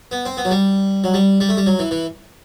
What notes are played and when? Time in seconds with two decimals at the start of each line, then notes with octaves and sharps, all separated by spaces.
0.11 B3
0.25 C4
0.37 B3
0.45 F#3
0.51 G3
1.04 F#3
1.14 G3
1.40 G3
1.49 A3
1.57 G3
1.66 F#3
1.79 E3
1.91 E3